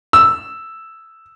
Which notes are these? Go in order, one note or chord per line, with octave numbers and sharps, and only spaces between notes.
E6